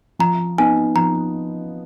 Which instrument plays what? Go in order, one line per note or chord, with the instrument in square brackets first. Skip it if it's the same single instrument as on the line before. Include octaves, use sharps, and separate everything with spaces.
[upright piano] F3 [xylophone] A#5
[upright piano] B3 D#4 [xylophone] G#5
[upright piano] F3 [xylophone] A#5